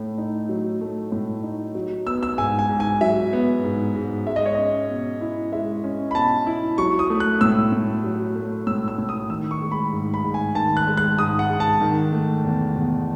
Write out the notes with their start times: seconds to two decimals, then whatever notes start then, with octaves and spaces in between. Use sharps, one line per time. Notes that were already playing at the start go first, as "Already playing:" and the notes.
Already playing: A2 A3
0.18 D#4
0.49 F#3
0.81 A3
1.12 A2
1.43 D#4
1.75 F#3
2.06 B3 E6
2.23 E6
2.38 G#2 G#5
2.59 G#5
2.69 G#2
2.80 G#5
3.01 F#3 E5
3.33 B3
3.64 G#2
3.95 G#2
4.27 G#3 E5
4.36 D#5
4.46 C#5
4.55 C#4 D#5
4.90 B2
5.21 E4
5.52 G#3 E5
5.84 C#4
6.11 B5
6.15 B2 A5
6.47 E4
6.78 F#3 C#6
6.99 D#6
7.10 A3
7.20 F#6
7.41 A2 E6
7.72 A2
8.04 F#3
8.35 A3
8.67 A2 E6
8.88 E6
8.98 A2
9.09 D#6
9.30 D#3 E6
9.51 C#6
9.62 G#3
9.71 B5
9.93 G#2
10.14 B5
10.24 G#2
10.34 G#5
10.55 D#3 A5
10.77 F#6
10.87 G#3
10.97 F#6
11.18 G#2 D#6
11.39 F#5
11.50 G#2
11.60 A5
11.81 D#3
12.12 A3
12.44 E2
12.76 E2